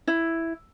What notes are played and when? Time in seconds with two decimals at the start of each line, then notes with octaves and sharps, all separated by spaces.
0.07 E4